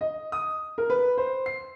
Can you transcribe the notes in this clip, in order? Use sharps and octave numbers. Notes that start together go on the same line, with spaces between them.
D#5
D#6
A#4
B4
C5
C7